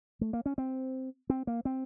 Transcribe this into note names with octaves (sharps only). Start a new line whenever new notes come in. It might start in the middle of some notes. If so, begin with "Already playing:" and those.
A3
A#3
C#4
C4
C4
A#3
C4